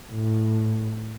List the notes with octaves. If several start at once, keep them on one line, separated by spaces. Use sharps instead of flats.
A2